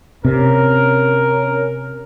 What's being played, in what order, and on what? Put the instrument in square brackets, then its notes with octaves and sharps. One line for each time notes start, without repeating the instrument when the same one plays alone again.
[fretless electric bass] C3 [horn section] C#4 A#4